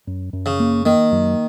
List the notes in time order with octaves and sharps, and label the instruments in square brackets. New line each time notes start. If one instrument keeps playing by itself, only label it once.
[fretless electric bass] F#2
F#2
[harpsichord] C#3
[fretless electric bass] A#3
[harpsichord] D#3 [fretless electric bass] A#3
[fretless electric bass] F#2